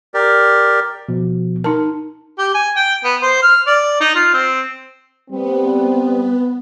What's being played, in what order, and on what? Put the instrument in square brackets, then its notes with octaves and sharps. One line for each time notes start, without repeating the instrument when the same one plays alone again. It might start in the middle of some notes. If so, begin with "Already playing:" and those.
[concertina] G4 A#4 D5
[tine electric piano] B2 F3
[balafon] D#4 A5 [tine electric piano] A#4
[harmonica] G4
G#5
G5
B3
C5
F6
D5
D#4
F4
C4
[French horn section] G3 C4 [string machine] B3